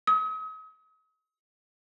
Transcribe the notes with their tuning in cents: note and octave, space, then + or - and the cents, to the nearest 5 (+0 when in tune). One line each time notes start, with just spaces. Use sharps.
D#6 +40